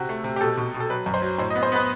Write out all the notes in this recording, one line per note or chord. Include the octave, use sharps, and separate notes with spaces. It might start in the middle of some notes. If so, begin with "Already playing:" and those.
Already playing: C3 F#4
A3
C3
G4
B2 A4
B2
B2
A4
F#3 B4
F#2
C5
F#3
A2 C5
D#5
B3
C5
B3 B4